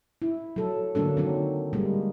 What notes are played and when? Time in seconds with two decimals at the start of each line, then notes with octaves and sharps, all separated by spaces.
0.22 E4
0.56 F#3 A4
0.95 D3 F#3 A#3 D4 A4
1.17 D#3 F#3 C4
1.73 G3 G#3 A#3